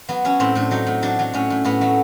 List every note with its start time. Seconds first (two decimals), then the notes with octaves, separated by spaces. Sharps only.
0.09 F#3 B3
0.25 F#3 C#4
0.40 A2 C4
0.55 A2 D4
0.71 F#3 D#4
0.87 A2
1.02 F#3 D4
1.19 F#3
1.33 A2 C#4
1.50 A2
1.64 A2 B3
1.81 F#3 A3